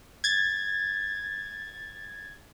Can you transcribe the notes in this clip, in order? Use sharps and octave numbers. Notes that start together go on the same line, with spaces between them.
G#6 A6